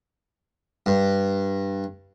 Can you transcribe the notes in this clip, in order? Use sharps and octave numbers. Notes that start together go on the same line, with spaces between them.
G2